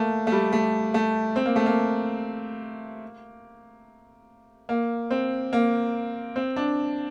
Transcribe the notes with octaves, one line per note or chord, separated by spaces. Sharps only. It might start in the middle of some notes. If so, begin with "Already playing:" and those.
Already playing: A3 A#3
A3
G3
A3
A3
C4
A#3
A3
A#3
A#3
C4
A#3
C4
D4